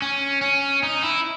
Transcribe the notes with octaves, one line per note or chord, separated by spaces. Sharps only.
C#4
C#4
D#4
E4